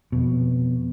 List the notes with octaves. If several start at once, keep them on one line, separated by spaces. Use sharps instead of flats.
F2 B2